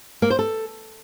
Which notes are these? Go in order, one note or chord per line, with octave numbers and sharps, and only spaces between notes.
A#3
C5
A4